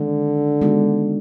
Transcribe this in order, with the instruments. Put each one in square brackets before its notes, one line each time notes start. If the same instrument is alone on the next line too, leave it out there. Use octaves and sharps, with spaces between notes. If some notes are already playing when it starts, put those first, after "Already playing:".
Already playing: [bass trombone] D3 [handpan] D#3 G#3 C4
[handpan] D#3 G#3 B3 D#4 F#4